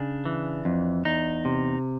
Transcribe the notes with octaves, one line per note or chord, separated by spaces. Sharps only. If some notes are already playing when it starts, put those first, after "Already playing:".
Already playing: C#3 D4
E3
F2
E2 D#4
C3